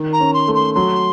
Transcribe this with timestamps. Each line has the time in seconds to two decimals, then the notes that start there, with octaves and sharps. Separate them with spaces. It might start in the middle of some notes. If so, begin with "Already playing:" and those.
Already playing: D#3
0.13 A#5
0.20 C#4
0.34 C6
0.48 A3
0.55 C6
0.75 F#3 C6